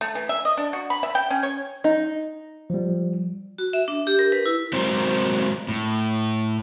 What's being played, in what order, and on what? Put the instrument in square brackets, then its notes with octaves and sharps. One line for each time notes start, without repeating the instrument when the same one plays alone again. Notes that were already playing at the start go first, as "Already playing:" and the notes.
[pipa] A3
E3
E5
D#5
D4
F#4
B5
E5
G5
C#4
C#5
[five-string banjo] D#4
[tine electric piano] F3 G3
[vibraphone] F#4
E5
D4
G4
A#4
B4
E4
[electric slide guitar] F#3 G#3 C4 A#4 C5
A2